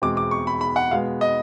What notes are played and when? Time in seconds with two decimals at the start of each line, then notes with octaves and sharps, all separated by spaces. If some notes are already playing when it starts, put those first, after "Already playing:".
0.02 E2 B2 G#3 C4 D6
0.17 D6
0.31 C#6
0.47 B5
0.61 B5
0.76 F#5
0.91 B2 G#3 B3 F5
1.21 D#5